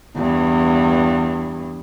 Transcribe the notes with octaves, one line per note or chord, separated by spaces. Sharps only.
E2 G2